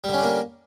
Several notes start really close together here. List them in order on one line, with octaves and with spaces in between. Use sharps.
G3 D3 C#4 D4 A#3